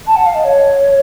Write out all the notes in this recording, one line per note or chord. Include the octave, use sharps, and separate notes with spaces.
A5
F#5
F5
D#5
C#5